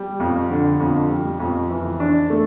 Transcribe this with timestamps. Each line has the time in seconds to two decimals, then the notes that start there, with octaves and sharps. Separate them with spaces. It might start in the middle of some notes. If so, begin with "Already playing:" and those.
Already playing: G3
0.20 F2
0.49 D3
0.80 F2
1.10 G3
1.40 F2
1.70 E3
2.00 D4
2.30 A3